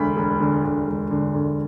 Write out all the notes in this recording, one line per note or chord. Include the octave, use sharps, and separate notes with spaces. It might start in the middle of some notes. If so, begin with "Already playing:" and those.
Already playing: E1 D2 B5
E1
D3
D2
E1
D3
D2